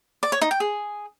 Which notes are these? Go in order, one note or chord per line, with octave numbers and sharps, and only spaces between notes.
D5
C#5
D#4
G5
G#4